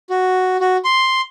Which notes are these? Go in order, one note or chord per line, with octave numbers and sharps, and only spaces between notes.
F#4
F#4
C6